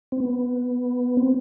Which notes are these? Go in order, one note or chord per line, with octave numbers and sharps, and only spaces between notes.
C4
B3
C4